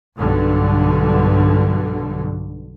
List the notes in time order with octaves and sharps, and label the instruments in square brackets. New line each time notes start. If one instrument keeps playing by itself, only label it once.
[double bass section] B1 G2 D3